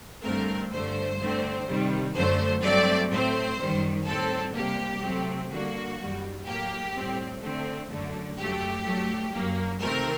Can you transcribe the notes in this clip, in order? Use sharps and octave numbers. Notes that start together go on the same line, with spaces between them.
G2 D3 A3 C4 A#4
G2 D3 A3 C5
D3 A3 C4
C3 D#3 G3
F#2 D3 F#3 A3 C5
G2 F#3 A3 C4 D5
A2 A3 C4 C5
F#2 D#3 G3
A2 G3 C4 A4
C3 G3 A#3 G4
C3 F#3 A3 C4
D3 G3 A#3 F#4
F#2 D#3 G3
A2 F#3 A#3 G4
A2 G3 C4
D3 A3 C4
F#2 D3 A3
F#2 F#3 A3 G4
G2 F#3 A3
F#2 F#3 A#3
C3 D#3 A3 C4 A#4